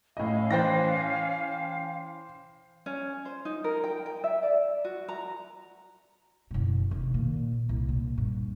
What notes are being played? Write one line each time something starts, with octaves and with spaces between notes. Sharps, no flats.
A2 C#4 D#5 F5
E3 C5 G5 F#6 A6 A#6
C#4
C5
D#4
A#4
G5
G5
E5
D5
F#4
A#5
F#1 B2
C3 D#3
A#2
C2
A#2
G2